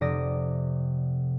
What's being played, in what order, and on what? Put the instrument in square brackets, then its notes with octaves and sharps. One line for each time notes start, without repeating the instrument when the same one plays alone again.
[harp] F1 C3 D5 D#6 A#6